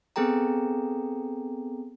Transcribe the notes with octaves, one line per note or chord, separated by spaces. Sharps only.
B3 C4 G#4 A4 G5 A#5